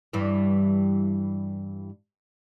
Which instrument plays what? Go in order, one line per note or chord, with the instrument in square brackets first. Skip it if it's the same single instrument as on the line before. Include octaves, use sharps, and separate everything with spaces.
[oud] G2 E3